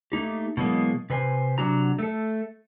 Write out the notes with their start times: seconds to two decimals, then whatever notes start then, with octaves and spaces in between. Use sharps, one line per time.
0.12 A3 A#3 D#4 G4
0.57 B2 E3 F#3 G#3 A#3
1.10 C3 B4 C5 G#5
1.58 C3 F#3 D4 F#4 A#5
1.99 A3 A4